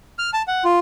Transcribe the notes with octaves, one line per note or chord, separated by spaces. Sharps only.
F6
A5
F#5
F4